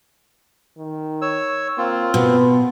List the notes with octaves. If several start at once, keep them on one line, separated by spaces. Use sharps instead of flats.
D#3
C#5 E6
A#3 C4 F4
B2 B4